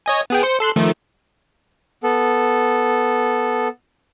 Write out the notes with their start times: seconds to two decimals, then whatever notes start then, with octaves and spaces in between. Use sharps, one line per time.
0.06 C#5 D#5 G#5
0.30 B3 G#4 G5
0.43 C5 C#7
0.60 A4 C6 F#6
0.76 D#3 F3 A3
2.03 B3 A4